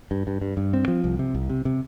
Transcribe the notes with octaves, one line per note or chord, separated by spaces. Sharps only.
G2
G2
G2
G2
C4
F3
C2
C3
C2
C3
C3